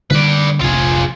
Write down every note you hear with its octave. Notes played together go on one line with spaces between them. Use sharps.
D3 G3 A#3 B4 D5
F1 A#1 F2 F4 G#4